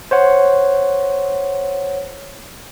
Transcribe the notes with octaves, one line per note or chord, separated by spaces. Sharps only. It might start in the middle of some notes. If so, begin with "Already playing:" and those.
C5 C#5 F#5